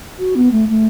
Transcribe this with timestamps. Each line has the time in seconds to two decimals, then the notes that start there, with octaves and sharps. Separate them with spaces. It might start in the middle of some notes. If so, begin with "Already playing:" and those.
0.19 F#4
0.35 B3
0.52 A3
0.69 A3